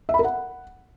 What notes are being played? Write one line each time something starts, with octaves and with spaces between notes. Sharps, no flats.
E5
B5
A#4
F#5